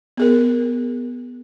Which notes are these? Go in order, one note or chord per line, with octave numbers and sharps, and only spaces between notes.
B3 G#4 A#4